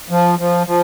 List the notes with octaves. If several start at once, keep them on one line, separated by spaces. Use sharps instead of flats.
F3
F3
F3